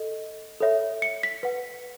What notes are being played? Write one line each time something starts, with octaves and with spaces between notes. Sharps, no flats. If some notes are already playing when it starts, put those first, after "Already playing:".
Already playing: A4 D#5
A4 C#5 E5
C#7
B6
B4 F#5